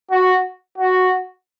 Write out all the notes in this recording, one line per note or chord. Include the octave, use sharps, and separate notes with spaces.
F#4
F#4